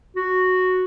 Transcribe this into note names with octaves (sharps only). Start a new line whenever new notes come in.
F#4